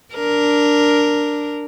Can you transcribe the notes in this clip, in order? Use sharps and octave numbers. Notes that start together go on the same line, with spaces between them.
D4 A#4